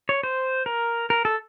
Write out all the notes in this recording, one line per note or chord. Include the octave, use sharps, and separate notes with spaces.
C#5
C5
A#4
A#4
A4